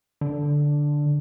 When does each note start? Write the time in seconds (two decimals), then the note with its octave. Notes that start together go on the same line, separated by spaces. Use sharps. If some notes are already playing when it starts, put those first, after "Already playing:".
0.21 D3